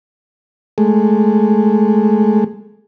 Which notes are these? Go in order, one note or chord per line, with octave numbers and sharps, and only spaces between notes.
G#3 A3